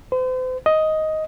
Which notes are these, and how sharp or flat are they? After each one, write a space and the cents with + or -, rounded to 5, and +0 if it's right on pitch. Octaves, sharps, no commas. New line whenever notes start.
C5 -40
D#5 +10